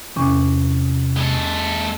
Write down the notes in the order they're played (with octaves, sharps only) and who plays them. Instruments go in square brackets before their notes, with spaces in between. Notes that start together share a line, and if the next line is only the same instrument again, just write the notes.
[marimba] E2 C#4 D6 [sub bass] C3
[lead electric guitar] G#3 A4